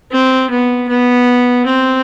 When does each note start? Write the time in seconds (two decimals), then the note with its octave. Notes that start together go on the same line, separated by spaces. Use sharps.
0.12 C4
0.50 B3
0.89 B3
1.66 C4